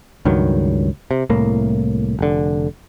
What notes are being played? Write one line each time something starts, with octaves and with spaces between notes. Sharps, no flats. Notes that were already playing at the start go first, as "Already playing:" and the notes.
C#2 G2 D#3 F#3
C3
C2 A2 A#3
F1 D3